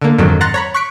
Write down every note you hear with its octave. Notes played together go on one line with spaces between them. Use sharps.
D3 A#3
F2 G#2 D3 D#3 F#3
F#5 A#5 C6 F#6 A6 A#6
C#5 A#5 B5
C#6 F#6 B6 C#7 D7